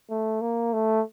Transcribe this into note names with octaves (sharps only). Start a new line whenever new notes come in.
A3
A#3
A3